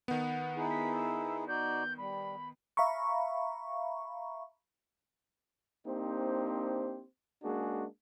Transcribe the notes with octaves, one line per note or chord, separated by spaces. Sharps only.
D#3 B3 F#5
D#4 E4 G#4
B6
E5
D#4 F#4 D5 G6
G3 B5
E5 F5 A#5 B5 C#6
A#3 C4 D4 D#4 G4 C5
G#3 A#3 C#4 D4 F#4 G#4